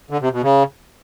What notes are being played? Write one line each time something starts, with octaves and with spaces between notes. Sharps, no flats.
D3
C3
B2
C#3